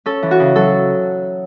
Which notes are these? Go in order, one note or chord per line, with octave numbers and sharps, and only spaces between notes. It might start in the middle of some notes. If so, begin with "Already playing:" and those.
C#4 A4
E3
F#4
C#3
F#3 A4